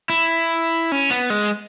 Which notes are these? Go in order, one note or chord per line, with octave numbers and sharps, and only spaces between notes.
E4
C#4
B3
G#3